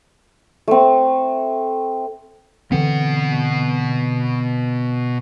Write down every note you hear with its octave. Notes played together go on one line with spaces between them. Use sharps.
A3 C4
B2 D3 E3 C4 F#5